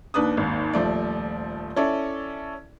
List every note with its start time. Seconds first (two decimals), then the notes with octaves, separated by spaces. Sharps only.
0.14 D#2 D4 B4 D#6
0.37 G#1 D#2
0.73 D#1 F3 A3 D5
1.76 C#4 E4 A4 D5